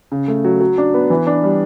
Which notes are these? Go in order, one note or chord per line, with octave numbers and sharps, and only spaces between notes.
C#3
A3
F#3
F#3
D4
B3
E3
D4
G3